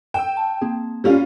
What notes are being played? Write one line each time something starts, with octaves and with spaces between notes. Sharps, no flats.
G5 E6 E7
A5
A#3 C4 G#4
G3 C#4 F4